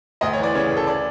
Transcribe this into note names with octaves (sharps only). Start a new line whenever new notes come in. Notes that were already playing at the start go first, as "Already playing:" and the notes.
D2 D#5
C#5
E3 D5
C#3 C#5
D2
A4
D5